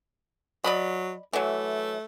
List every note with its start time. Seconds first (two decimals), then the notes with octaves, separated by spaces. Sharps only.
0.64 F#3 D5 D#5 B5
1.33 E3 F#3 A3